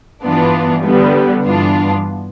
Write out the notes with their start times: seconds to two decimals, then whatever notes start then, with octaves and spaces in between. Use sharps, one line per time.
0.24 G2 E3 B3 D4 F4
0.84 D3 G3 B3
1.44 G2 E3 B3 D4 F4